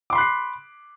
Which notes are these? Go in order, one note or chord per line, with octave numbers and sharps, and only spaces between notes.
B5 C6 D6 F#6 C7